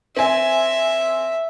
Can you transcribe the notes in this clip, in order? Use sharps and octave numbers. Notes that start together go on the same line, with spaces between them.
C4 E5 G#5